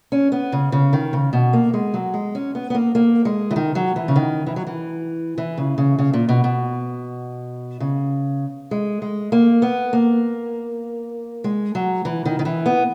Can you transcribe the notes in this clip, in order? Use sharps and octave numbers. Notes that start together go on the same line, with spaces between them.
C#4
B3
C#3
C#3
D#3
C#3
B2
A#3
G#3
F#3
G#3
C#4
B3
B3
A#3
A#3
G#3
E3
D#3
F#3
E3
C#3
D#3
E3
F#3
E3
E3
C#3
C#3
C#3
A#2
B2
B2
C#3
G#3
G#3
A#3
B3
A#3
G#3
F#3
E3
D#3
D#3
E3
B3